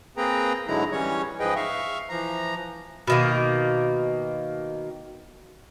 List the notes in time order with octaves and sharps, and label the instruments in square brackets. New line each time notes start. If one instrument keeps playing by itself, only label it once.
[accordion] A#3 C4 G#4 B4 G5 A#5
G#2 D3 F#3 G#3 E4 A#5
E3 G3 C#4 C#5 C#6
G#2 F3 G#4 B4 D#5 G5
E5 F5 C#6
E3 F3 A#5
[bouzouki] B2 D#3 A#3